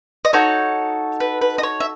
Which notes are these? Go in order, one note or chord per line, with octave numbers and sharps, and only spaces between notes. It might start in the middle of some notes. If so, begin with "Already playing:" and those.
D#5
D#4 F#4 A4 C#5
B4
B4
D#5
C#5
E5